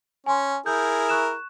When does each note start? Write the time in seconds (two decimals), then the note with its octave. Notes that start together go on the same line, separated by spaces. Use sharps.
0.26 C#4 G#5 C6
0.66 E4 G#4 A#4 G6
1.09 C#6 F#6 E7